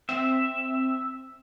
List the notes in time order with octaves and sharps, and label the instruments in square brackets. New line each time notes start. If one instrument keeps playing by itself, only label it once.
[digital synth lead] C4 [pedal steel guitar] E5